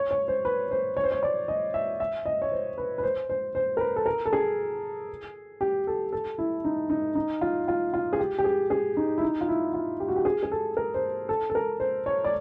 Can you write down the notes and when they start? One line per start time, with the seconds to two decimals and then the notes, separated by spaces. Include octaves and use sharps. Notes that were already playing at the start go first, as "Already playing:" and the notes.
Already playing: C#5
0.11 C#5
0.28 C5
0.45 B4
0.71 C5
0.97 C#5
1.04 C5
1.12 C#5
1.23 D5
1.48 D#5
1.74 E5
2.00 E5
2.26 D#5
2.42 C#5
2.52 C5
2.78 B4
2.98 B4
3.03 C5
3.29 C5
3.55 C5
3.77 A#4
3.80 B4
3.96 A4
4.06 A#4
4.26 A4
4.33 G#4
5.61 G4
5.87 A4
6.13 A4
6.38 E4
6.64 D#4
6.90 D#4
7.15 D#4
7.41 F4
7.68 F4
7.94 F4
8.13 G#4
8.19 G4
8.39 G4
8.44 G#4
8.70 G#4
8.97 D#4
9.18 E4
9.23 D#4
9.41 F4
9.49 E4
9.74 F4
10.00 G4
10.08 F#4
10.16 G4
10.25 G#4
10.43 G#4
10.52 A4
10.77 A#4
10.94 C5
11.29 A4
11.50 A4
11.55 A#4
11.80 C5
12.06 C#5
12.25 D5